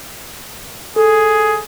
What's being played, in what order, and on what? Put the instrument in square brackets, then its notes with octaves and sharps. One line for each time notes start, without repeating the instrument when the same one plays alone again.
[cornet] G#4 [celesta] A4